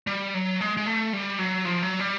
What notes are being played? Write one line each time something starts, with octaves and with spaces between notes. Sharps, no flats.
G3
F#3
G#3
G#3
A3
G3
F#3
F3
F#3
G3